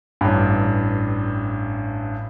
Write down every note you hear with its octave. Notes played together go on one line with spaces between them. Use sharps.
A1 G2